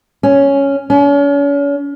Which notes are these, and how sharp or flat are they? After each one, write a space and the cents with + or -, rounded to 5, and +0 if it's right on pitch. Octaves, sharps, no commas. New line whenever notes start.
C#4 +5
C#4 +40